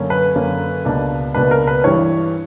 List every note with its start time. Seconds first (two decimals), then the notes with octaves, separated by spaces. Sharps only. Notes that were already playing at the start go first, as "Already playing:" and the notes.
Already playing: F#2 D3 A#3 C#4
0.10 B4
0.35 F#2 D3 A#3 C#4
0.85 C#2 B2 A#3 D4
1.34 C#2 B2 A#3 D4 B4
1.51 A#4
1.67 B4
1.84 G2 E3 G3 C#5